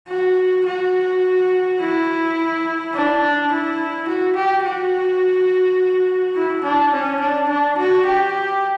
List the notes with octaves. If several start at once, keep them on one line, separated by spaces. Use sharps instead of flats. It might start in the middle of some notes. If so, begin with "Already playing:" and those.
F#4
F#4
E4
D4
E4
F#4
G4
F#4
E4
D4
C#4
D4
D4
F#4
G4